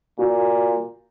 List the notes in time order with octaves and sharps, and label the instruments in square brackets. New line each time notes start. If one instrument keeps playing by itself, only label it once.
[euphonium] A#2 [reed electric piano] F#4